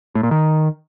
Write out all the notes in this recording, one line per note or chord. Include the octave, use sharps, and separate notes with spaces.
A2
A#2
D#3